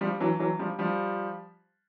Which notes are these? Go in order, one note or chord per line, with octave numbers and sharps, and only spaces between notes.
F3 G3
E3 F#3
E3 F#3
F3 G3
F3 G3